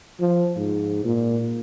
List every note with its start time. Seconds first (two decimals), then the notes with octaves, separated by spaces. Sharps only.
0.20 F3
0.57 G#2
1.05 A#2